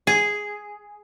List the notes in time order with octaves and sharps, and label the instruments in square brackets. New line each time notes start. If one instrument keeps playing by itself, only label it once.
[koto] G#4